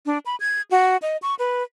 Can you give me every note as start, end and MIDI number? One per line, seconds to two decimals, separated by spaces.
0.06 0.18 62
0.26 0.36 83
0.40 0.62 92
0.71 0.97 66
1.02 1.17 75
1.22 1.35 85
1.39 1.63 71